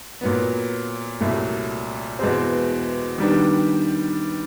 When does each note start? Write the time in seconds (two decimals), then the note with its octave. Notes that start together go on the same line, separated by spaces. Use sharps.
0.21 A#2 F#3 B3
1.20 C2 A#2 F#3 A3
2.19 E2 B2 G#3 C4
3.18 D#3 G3 B3 D4